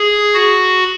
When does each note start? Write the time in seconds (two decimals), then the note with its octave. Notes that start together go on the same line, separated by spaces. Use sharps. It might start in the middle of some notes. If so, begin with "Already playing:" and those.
Already playing: G#4
0.34 F#4